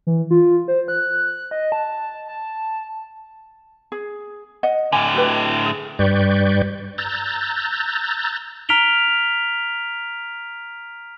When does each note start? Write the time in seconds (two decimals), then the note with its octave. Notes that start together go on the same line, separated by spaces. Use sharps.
0.07 E3
0.31 F4
0.68 C5
0.88 F#6
1.51 D#5
1.72 A5
2.28 A5
3.92 G#4
4.63 D#5 F#5
4.92 A2 D3 G#5
5.14 F#4 G4 B4
5.66 G#4
5.99 G2 G3 B4 D5 C#6 G6
6.98 A#5 E6 F#6 G6 A6
8.69 A#5 F6 B6 D7 F7 G7